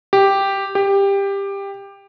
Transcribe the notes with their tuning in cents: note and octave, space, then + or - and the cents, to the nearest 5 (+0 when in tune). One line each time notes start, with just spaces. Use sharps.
G4 +0
G4 +15